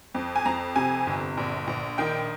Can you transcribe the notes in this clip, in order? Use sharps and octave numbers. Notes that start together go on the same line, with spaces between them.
F2
G#5
F2 A#5
C3 G#5
G1
A#1
A#1
D#3 G5